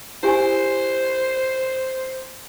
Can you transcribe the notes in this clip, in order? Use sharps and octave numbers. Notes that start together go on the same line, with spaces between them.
E4 G4 C5 G#5